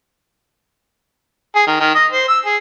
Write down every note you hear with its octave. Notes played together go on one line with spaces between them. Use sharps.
G#4
D#3
D#3
D#5
C5
E6
G#4